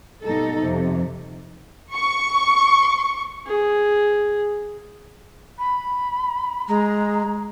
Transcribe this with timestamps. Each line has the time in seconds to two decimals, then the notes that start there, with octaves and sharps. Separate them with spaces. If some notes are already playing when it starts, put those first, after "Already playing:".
0.23 B2 G3 D#4 A4
0.60 F2 C3
1.94 C#6
3.47 G#4
5.58 B5
6.68 G#3 A#5